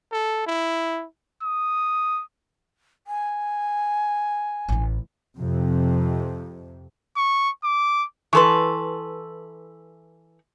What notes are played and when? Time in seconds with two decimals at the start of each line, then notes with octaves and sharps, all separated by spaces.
0.12 A4
0.47 E4
1.43 D#6
3.07 G#5
4.69 A1 E4
5.36 F2 C3
7.16 C#6
7.64 D6
8.33 E3 A4 B4 C6 C#6